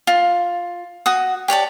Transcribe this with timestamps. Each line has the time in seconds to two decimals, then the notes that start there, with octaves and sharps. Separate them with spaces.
0.07 F4
1.06 F#4 D#6
1.48 G4 C#5 D5 A5